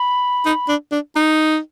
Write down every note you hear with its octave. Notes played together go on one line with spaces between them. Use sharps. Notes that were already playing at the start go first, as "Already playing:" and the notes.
Already playing: B5
D#4
D4
D4
D#4 A#5